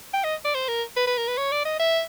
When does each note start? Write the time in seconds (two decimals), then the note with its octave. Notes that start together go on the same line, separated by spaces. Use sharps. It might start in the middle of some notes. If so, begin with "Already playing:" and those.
0.13 G5
0.24 D#5
0.45 D5
0.55 C5
0.68 A#4
0.96 B4
1.07 B4
1.17 A#4
1.28 B4
1.37 C#5
1.52 D5
1.65 D#5
1.79 E5